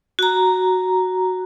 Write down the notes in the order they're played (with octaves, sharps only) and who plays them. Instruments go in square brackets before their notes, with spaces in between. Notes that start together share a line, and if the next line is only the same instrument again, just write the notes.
[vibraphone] F#4 A#5